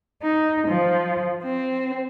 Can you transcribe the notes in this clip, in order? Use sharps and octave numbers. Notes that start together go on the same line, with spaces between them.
D#4
F3
C4